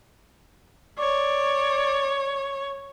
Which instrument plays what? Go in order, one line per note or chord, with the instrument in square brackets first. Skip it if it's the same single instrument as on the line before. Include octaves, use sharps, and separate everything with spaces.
[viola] C#5 [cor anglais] D5